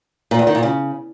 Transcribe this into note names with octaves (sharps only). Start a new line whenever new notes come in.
A#2
E2
D#3
A#2
C#3